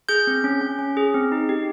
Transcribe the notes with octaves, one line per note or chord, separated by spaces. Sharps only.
G#4 G6
C4
C#4
C#4
C#4
G#4
C4
D#4
G4